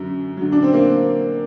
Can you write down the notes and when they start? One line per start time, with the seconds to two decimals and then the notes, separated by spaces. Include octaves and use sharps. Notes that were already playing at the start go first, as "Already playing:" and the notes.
Already playing: F#2 D3 F#3
0.37 D3 F#3
0.52 D4
0.63 C4
0.74 A#3